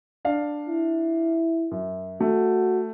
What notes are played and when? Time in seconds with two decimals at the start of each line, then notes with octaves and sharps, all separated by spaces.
0.25 D4 F5
0.68 E4
1.71 F#2
2.21 A3 F#4